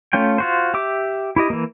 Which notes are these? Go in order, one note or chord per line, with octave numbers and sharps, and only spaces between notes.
A3 C#4 F4 G5
F4 F#4 C5
G4 E5 D6
E4 G4 D#5
E3 A#3